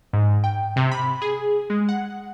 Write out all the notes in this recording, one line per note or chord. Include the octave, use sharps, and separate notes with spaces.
G#2
G5
C3
B5
G#4
G#3
F#5